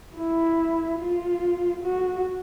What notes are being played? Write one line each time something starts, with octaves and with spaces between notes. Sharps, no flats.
E4
F4
F#4